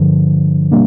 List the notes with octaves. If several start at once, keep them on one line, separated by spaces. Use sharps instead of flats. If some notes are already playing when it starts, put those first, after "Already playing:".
Already playing: G2 D3 F3
B2 G3 A#3 D4